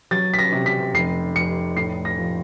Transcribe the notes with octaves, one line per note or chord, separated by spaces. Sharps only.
F#3 A6
B6
A#6
C3
B6
F1 C7
F1 C#7
A2 C7
A#6
F3